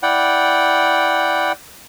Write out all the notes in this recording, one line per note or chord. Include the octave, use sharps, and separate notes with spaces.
E4 D5 F#5 G5